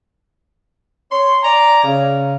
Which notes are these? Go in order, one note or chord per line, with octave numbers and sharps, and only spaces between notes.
C#5 C6
D5 G#5 A#5
C#3